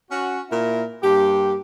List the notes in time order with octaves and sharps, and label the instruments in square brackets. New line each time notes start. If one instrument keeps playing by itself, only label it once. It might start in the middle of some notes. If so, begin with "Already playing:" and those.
[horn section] C#4 F#4
A#2 E4 A#4
G2 A#3 G4